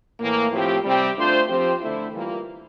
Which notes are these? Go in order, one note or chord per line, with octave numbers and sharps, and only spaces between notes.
A2 E3 A#3
A2 F3 C4 G4
C3 G3 C4 G4
A3 D4 F4 C5
F3 C4 G4 C5
D3 A3 E4
E3 G3 A#3 F4